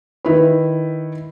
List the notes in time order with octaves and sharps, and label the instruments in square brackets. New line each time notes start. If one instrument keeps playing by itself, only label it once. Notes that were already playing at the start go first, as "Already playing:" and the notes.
[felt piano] D#3 E4 B4